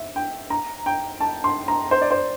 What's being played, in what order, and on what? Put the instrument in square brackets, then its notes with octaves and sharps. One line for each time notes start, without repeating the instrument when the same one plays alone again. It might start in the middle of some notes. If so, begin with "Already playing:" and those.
Already playing: [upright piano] E5
G5
A#5
G5
A5
C6
A#5
C5
D5
C5